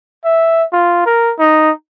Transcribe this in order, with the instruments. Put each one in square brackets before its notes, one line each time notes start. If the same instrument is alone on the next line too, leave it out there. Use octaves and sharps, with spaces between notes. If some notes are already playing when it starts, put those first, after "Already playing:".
[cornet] E5
F4
A#4
D#4